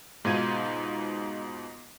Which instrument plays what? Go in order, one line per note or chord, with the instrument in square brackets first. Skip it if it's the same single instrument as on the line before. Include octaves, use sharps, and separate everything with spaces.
[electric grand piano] G#2 B2 D#4 F4 G#6 D#7